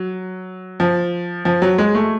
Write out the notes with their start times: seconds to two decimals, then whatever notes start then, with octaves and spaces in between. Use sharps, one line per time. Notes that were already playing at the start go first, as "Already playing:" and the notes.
Already playing: F#3
0.80 F3
1.45 F3
1.62 F#3
1.78 G#3
1.95 A3